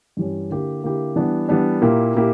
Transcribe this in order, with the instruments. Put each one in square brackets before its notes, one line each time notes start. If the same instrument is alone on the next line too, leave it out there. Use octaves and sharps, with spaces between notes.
[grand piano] G2 E3 G3 C#4
D3 A#3 E4 G4
D3 A#3 E4 G4
E3 G3 B3 D4
E3 G3 B3 D4
A#2 A#3 E4 G4
A#2 A#3 E4 G4